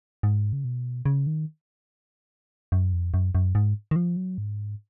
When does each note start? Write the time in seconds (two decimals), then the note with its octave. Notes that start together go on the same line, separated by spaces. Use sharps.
0.23 G#2
0.53 C#3
0.64 B2
1.06 C#3
1.27 D#3
2.72 F#2
2.93 F2
3.14 F#2
3.35 F#2
3.55 G#2
3.91 D#3
3.96 F3
4.17 F#3
4.38 G#2